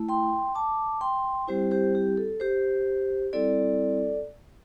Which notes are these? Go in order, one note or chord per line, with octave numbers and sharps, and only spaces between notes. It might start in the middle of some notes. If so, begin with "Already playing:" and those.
Already playing: A3 E4
G5 C6
A5 D6
G5 C6
G3 C4 E4 G4 C5
G4 C5
G4
A4
G4 C5
G3 C4 E4 A4 D5